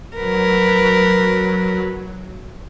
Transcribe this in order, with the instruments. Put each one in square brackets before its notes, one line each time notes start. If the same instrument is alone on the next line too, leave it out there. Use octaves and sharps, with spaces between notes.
[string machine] F#3 [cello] A#4 B4